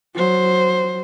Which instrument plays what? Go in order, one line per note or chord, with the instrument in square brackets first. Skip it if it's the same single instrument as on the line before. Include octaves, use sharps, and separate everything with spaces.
[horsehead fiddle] F#3 C5